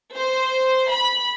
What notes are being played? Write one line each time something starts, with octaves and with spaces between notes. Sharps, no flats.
C5
B5